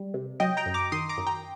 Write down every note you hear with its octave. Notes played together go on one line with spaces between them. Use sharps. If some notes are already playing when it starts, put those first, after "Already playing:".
Already playing: G3
C3
F#3 D#5 G5
G5 A#5
F#2
A#5 D6
D#3 C6 D#6
A#5 D6
F#2
G5 A#5